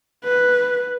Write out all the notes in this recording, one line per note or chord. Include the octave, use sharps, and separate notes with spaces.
B4